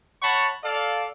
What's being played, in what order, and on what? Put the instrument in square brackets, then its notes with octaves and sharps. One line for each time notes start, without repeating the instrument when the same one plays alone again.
[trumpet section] C#5 F#5 A5 B5 C#6
A4 D5 F5